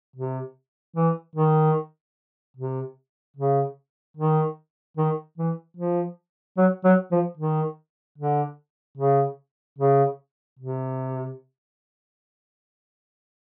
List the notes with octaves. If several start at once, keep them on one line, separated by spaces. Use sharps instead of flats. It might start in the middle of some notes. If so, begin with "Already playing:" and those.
C3
E3
D#3
C3
C#3
D#3
D#3
E3
F3
F#3
F#3
F3
D#3
D3
C#3
C#3
C3